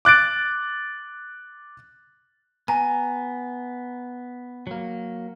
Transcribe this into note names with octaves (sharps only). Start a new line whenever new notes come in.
D6 F#6 A6 D7
B3 G#5 A#5
F#3 A#3